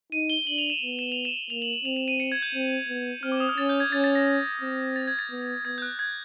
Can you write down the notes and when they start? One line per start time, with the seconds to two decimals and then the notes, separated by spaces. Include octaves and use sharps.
0.12 D#4 D#7
0.30 G7
0.47 D4 F#7
0.58 F7
0.70 E7
0.82 B3
0.99 E7
1.12 F7
1.25 E7
1.50 A#3 F7
1.62 F#7
1.73 F#7
1.85 C4 F7
1.96 E7
2.08 D#7
2.20 C#7
2.32 G#6
2.42 G6
2.54 C4
2.89 B3
3.23 C4 F6
3.32 D6
3.40 D#6
3.49 F6
3.58 C#4 A6
3.69 G6
3.80 G#6
3.92 C#4 A6
4.04 A6
4.15 A#6
4.61 C4
4.96 A6
5.07 G#6
5.19 A6
5.31 B3
5.65 B3 G#6
5.78 G6
5.82 F#6
5.99 G#6